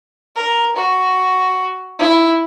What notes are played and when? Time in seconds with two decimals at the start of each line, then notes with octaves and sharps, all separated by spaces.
0.35 A#4
0.76 F#4
1.99 E4